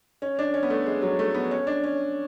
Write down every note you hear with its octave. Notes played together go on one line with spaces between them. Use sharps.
C#4
D4
C#4
B3
A3
G#3
F#3
A3
B3
C#4
D4
C#4